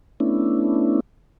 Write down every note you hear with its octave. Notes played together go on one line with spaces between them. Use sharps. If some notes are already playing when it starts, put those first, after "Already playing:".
A3 B3 C#4 D4 E4